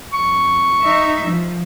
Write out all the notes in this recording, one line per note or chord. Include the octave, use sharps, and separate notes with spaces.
F2 C#6
D#4 E5
F3